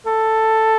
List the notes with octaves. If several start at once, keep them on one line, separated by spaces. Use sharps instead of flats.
A4